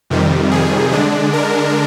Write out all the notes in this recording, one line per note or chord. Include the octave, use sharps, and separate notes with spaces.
F2 C3 D#3 G3
G#4
D3 G#3 D4
A#4